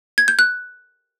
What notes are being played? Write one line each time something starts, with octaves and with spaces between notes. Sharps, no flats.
G#6
G6
F#6